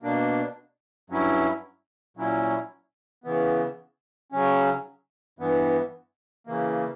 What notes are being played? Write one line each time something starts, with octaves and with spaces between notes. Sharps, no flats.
B2 A#3 D4
G2 F#3 C#4 E4
A#2 F#3 C#4 E4
C#3 E3 B3
C#3 F#3 C#4
G2 E3 B3
C#3 E3 A#3